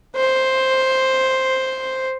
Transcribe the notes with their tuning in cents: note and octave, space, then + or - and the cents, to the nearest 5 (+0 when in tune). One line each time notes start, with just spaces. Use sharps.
C5 +5